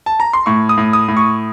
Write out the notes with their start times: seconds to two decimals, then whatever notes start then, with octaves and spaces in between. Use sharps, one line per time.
0.06 A5
0.20 A#5
0.33 C6
0.46 A2 C#6
0.69 D#6
0.78 A2
0.93 D#6
1.08 A2
1.17 C#6